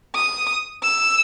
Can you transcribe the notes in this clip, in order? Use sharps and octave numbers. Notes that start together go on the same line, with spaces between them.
D#6
E6